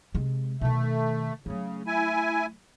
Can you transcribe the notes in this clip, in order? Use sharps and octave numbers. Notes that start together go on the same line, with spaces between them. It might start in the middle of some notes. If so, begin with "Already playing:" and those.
C3 G#3
B2 D#3 A3
C#3 F#3 A3
E4 G#5